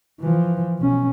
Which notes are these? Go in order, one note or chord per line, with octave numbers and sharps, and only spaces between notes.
E3 F3
B1 C#4